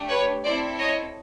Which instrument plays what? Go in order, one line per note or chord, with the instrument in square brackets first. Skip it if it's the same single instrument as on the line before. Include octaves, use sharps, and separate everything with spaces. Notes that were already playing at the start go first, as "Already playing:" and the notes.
Already playing: [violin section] A3 D4 G4
B4 C#5
C4 E4 A4 C5 D5
C#5 D#5